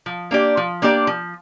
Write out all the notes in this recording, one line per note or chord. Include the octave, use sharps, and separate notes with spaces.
F3
A#3 D4 G4 D5
F3
A#3 D4 G4 D5
F3